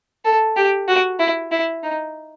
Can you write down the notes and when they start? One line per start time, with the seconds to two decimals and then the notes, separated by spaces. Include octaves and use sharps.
0.25 A4
0.57 G4
0.88 F#4
1.20 E4
1.52 E4
1.83 D#4